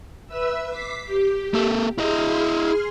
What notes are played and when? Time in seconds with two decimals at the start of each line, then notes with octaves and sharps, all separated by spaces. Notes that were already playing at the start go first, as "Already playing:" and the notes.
0.27 B4 E5 E6
0.68 D6 B6 C7
1.05 G4
1.54 A#3 A4
1.98 E4 G#4 D#5 C6 F6